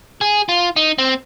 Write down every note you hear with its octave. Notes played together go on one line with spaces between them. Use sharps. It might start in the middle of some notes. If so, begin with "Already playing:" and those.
G#4
F4
D#4
C4